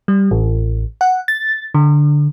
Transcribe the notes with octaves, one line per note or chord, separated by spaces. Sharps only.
G3
A1
F#5
A6
D3